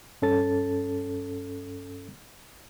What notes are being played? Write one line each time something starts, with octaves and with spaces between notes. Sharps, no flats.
G2 C#4 A4 A6